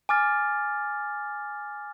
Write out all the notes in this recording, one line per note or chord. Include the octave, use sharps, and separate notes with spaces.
G#5 D6 F6 A6